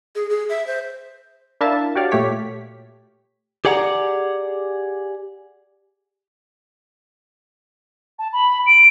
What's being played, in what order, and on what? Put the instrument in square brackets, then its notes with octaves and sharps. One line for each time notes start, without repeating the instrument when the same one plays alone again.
[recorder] G#4
G#4
E5
C5
[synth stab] D4 E4 A#4 E5 F5 A5
F#4 G4 C#5 D5 F5
A#2 A3 G4 C#5 B6
[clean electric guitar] G4 G#4 D5 F#5 G5 A#5
[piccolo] A5
B5
D7